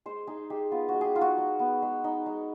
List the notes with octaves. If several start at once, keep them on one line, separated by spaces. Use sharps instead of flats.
G#3 C5
D#4 G#4
G#3 G4
B3 F4
F#4
G#3
G4 G#4
D#4 F4
F#4
G#3
B3
G#3
D#4
G#3